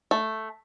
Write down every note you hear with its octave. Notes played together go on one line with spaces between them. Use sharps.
A3